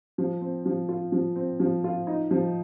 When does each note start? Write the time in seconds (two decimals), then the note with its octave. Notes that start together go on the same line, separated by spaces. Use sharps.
0.18 F3
0.41 C4
0.66 F3
0.89 F4
1.12 F3
1.36 C4
1.60 F3
1.84 F4
2.07 D#4
2.31 F3